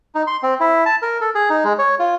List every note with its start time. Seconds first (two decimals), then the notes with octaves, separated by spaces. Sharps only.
0.15 D#4
0.27 C6
0.43 C4
0.60 E4
0.86 A5
1.02 A#4
1.21 A4
1.35 G#4
1.50 D#4
1.64 G#3
1.79 C#5
1.99 F4